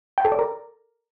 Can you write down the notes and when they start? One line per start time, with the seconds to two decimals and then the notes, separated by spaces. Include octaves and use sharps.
0.18 G5
0.25 A4
0.32 D5
0.39 A#4